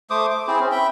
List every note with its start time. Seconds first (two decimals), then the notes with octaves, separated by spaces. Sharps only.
0.10 A3 C5 D6 D#6
0.31 D6
0.47 C4 E4 G#4 C5
0.60 C4 C#4
0.71 E5 G5 B5